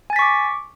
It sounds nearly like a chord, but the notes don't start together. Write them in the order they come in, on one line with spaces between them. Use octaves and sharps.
G#5 A6 B6 C#6 D6